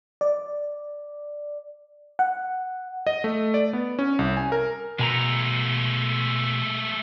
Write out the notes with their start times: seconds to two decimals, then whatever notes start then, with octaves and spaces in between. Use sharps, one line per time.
0.21 D5
2.19 F#5
3.07 D#5
3.24 A3
3.54 D5
3.73 B3
3.99 C#4
4.19 C2
4.37 G#5
4.52 A#4
4.99 B2 G#3 A3 G#5 A#5